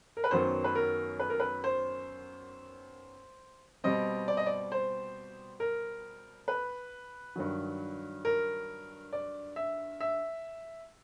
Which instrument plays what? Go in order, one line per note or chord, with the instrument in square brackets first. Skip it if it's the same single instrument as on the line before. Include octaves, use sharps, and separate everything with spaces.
[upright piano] A#4
B4
F#2 D#3 F#3 B3 C5
B4
A#4
B4
A#4
B4
C5
B2 G3 C4 D#5
D5
D#5
D5
C5
A#4
B4
G2 D#3 F#3
A#4
D5
E5
E5